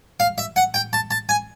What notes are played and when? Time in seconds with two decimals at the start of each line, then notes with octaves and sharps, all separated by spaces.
0.20 F5
0.38 E5
0.56 F#5
0.74 G5
0.93 A5
1.11 A5
1.29 G#5